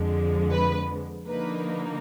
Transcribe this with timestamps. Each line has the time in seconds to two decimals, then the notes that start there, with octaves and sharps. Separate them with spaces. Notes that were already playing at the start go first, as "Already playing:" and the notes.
Already playing: F2 D3 F3 G#3
0.52 B4
1.27 D3 F3 A#3 D#4 B4